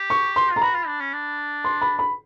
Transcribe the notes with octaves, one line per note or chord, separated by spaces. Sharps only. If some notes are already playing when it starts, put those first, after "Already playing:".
Already playing: G4
C#6
C6
F4
A#5
F#4 B5
F4
D4
C#4
D4
C6
B5
B5